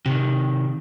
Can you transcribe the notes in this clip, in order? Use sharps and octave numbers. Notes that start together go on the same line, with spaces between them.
C3 D#3